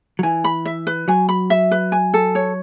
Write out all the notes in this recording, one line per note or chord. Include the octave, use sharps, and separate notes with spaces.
F#3
E3 G#5
B5
E5
B4
F#3 G#5
B5
E5
B4
G#5
A4
C#5